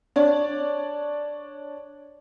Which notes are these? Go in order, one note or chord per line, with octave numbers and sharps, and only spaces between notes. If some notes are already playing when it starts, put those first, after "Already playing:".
D4 C#5 D5